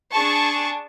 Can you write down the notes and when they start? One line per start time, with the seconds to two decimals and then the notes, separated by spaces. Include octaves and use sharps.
0.13 D4 G#4 A5 C#6